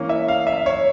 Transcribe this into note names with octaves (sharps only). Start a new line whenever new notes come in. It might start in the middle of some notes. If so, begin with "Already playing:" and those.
Already playing: E3 A#3 C#4
E5
F5
E5
C#5